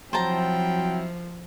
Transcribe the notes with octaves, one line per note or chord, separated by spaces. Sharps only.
F3 F#3 C4 E4 C5 G5 A5 A#5